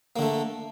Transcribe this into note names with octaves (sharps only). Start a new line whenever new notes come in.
D3 A3 A#3